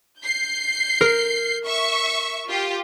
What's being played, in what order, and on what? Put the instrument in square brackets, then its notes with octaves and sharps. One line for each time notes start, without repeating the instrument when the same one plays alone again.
[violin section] G6 C7
[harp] A#4
[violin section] E5 C#6
F4 G4